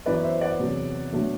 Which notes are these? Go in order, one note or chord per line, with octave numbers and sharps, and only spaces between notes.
F#2 E3 B3 B4 D5
C5 E5
D5 F#5
E2 C3 F#3
B2 F#3 A3 D4